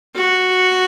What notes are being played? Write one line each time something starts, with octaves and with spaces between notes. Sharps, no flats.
F#4